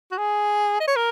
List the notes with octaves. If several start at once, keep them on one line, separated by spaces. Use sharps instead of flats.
F#4
G#4
D#5
C#5
A#4